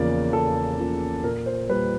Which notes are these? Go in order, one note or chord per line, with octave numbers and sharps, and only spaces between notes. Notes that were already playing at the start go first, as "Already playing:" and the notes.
Already playing: E2 C#3 F3 A#3 D5
E2 A4
C#3 F3 A#3
A#2 A#4
C5
G3 A#3 B4